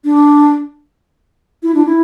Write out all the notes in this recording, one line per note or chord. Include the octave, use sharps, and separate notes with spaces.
D4
E4
D4
E4